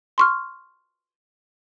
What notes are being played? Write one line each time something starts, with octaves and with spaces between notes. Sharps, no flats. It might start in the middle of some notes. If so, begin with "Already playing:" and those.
C6 C#6 F6